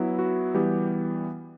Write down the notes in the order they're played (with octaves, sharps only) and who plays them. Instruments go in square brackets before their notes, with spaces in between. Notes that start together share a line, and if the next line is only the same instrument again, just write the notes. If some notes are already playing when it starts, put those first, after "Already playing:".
Already playing: [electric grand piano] F#3 B3 E4
F#4
E3 G3 B3 G4